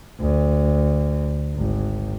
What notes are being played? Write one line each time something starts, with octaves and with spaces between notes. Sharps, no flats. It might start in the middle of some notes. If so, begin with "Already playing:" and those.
D2
G#1